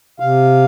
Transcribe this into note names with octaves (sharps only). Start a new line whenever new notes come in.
C3 F5